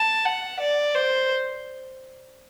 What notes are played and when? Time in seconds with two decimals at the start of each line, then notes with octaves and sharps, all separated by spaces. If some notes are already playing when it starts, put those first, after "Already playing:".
Already playing: A5
0.25 F#5
0.60 D5
0.95 C5